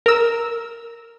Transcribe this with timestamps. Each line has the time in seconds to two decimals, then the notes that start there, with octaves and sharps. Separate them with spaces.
0.06 A#4 E6